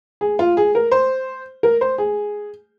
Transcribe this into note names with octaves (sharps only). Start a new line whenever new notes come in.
G#4
F4
G#4
A#4
C5
A#4
C5
G#4